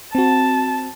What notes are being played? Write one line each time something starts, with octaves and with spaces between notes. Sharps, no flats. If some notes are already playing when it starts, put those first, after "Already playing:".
C4 F#4 A5